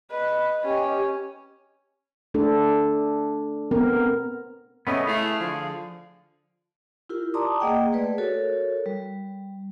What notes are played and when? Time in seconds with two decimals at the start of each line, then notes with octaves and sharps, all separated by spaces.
0.11 B4 D#5
0.64 C#4 G4
2.34 A3 D4 A4
3.71 B3 C4 A#4
4.87 C#3 A3 B3 C#4 D#5
5.07 A3 E4 G#4 F5
5.39 D3 F3
7.09 E4 F4 G4 A#4
7.34 D5 A5 A#5 C6 D6 D#6
7.60 A#3 G#4 D#5 F#5 G5
7.93 A3 G#4 B4 D5
8.18 F#4 A4 A#4 C#5
8.86 G3